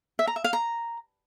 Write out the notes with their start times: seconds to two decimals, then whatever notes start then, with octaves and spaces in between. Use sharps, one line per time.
0.19 E5
0.27 A#5
0.36 E5
0.44 F5
0.53 A#5